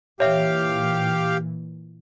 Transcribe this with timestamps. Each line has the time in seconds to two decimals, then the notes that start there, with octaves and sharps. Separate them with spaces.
0.20 A#2 E3 G4 C#5 E5 F5